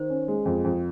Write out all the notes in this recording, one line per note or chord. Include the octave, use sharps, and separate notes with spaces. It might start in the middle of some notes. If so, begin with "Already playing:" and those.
Already playing: D#3 C5
C#4
G#3
F2
F2